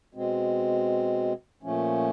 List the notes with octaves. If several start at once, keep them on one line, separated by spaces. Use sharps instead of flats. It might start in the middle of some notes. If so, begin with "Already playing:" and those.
B2 G#3 C4
A#2 F3 A3 C#4